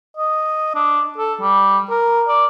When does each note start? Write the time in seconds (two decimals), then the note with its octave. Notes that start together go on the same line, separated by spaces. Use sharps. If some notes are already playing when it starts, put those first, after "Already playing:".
0.17 D#5
0.75 D4
1.18 A4
1.41 G3
1.90 A#4
2.28 D5